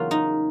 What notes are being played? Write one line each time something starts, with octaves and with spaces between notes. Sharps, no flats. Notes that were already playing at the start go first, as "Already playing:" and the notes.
Already playing: E2 C#3 F#3 A#3 C#4 F4
D#4